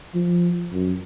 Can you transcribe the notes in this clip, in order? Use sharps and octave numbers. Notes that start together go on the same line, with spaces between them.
F3
F#2